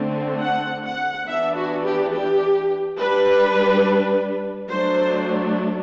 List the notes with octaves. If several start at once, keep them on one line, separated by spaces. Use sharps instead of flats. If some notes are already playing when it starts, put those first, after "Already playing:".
Already playing: D3 A3 C4
F#5
F#5
E3 B3 D4 E5
F#4
G4
G4
G3 D4 B4
F#3 A3 D4 C5